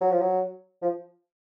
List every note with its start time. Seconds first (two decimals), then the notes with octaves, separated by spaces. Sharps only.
0.01 F#3
0.12 F3
0.21 F#3
0.82 F3